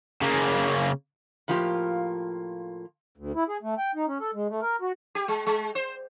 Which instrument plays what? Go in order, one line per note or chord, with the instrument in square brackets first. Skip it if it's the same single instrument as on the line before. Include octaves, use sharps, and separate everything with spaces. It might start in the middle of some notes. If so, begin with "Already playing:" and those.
[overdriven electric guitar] C#3 A#3
[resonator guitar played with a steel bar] A2 F3 A#3 F4 G4
[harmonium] D2
E4
G#4
A3
G5
D#4
C#4
A4
G#3
A3
A#4
F#4
[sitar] G4
G#3
G#3
C5